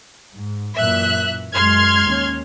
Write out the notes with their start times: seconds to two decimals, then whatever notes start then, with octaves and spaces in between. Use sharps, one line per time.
0.34 G#2
0.76 F#2 A#2 E3 E5 F#6
1.54 F#2 G#3 C6 F6 G#6
2.04 D#2 C#4